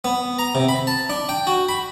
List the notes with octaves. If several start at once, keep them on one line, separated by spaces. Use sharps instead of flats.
B3
A#5
C3
B5
A5
D4
G5
F#4
B5